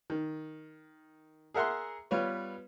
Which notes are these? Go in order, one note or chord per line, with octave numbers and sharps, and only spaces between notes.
D#3
G#4 A#4 E5 F#5 A#5 C6
G3 B3 F4 B4 C#5